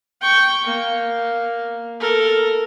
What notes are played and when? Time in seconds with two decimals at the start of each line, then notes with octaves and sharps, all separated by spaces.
0.21 G5 C#6
0.66 A#3
2.00 A4 A#4